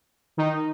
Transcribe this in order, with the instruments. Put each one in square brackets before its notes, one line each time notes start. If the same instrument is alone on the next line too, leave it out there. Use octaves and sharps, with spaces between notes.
[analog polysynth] D#3 D#4